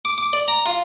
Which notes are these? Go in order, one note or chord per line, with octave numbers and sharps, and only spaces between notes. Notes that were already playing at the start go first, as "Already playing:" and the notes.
D6
D6
D5
A#5
F4